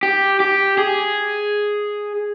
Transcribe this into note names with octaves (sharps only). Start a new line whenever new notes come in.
G4
G4
G#4